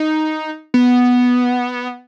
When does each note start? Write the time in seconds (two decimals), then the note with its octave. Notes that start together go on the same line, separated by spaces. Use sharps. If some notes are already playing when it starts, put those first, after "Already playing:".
Already playing: D#4
0.74 B3